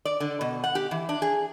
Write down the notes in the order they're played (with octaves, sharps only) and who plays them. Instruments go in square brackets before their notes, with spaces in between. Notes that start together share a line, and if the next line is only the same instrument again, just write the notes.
[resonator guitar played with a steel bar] D5
D3
B2
F#5
G4
E3
D4
G#4